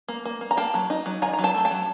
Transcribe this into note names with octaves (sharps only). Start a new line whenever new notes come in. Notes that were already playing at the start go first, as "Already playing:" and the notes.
A#3
A#3
A#3
A#5
A#3 G5 A5
F#3
D#4
F#3
D#3 G#5 A#5
A#5
F#3
G5 A5
A3
G5 A5
F#3